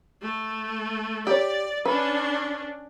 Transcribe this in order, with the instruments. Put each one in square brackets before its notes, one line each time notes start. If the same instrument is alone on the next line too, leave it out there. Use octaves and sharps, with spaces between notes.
[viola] A3
[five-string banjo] G4 C#5 [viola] D5
[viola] C#4 D4 [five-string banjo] B4